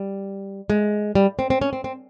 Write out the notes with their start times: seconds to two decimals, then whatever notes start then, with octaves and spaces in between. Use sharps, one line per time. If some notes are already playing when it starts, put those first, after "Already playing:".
Already playing: G3
0.70 G#3
1.15 G3
1.39 C4
1.50 C4
1.61 C#4
1.73 C4
1.84 C4